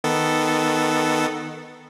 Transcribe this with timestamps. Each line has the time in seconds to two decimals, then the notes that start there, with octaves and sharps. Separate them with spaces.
0.04 D#3 B3 A4